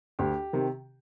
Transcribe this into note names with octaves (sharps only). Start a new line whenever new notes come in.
D2 G4
C3 D#3